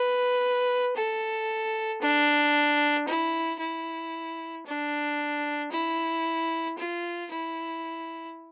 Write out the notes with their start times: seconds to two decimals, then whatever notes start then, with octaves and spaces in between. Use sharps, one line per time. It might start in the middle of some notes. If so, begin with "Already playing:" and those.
Already playing: B4
0.96 A4
2.01 D4
3.08 E4
3.60 E4
4.66 D4
5.71 E4
6.78 F4
7.31 E4